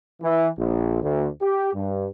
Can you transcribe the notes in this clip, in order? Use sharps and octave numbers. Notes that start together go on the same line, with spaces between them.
E3
A#1
D2
G4
G2